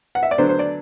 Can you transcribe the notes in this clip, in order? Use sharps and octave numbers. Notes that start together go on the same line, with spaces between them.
F#5
E5
D5
D3 F#3 B3 D4 C5
C5
D5